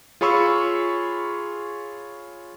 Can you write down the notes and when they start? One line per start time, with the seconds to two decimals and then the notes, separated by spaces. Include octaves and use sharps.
0.21 F4 G#4 C#5 B5 C#6 E6